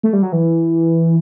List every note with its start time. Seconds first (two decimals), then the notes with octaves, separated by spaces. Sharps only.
0.03 A3
0.13 G3
0.22 F#3
0.32 E3